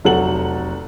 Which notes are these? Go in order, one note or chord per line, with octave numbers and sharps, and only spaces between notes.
F1 F#3 A4 F#5 F#7